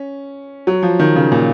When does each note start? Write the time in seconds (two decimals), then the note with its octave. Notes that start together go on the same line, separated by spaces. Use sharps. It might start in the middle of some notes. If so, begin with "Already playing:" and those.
Already playing: C#4
0.67 F#3
0.83 F3
0.99 D#3
1.16 C#3
1.32 A#2